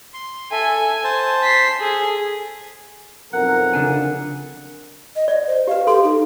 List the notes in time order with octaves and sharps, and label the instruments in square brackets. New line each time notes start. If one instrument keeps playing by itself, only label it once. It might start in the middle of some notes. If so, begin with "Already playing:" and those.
[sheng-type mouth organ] C6
[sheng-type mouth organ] A4 E5 [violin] G#5
[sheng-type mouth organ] C5 A5
[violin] B6 C7
[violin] G#4 [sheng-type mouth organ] A4
[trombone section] B1 F2 A#4 [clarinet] F#5
[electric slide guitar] C#3 D4 G#5
[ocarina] D#5
[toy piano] D5 [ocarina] D#5
[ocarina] C5
[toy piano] G4 B4 [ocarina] F5
[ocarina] G4 [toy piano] A4 C6
[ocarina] D#4